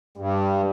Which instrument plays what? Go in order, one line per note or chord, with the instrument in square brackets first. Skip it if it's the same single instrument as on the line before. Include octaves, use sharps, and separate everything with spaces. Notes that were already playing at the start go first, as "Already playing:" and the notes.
[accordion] G2 [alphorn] G3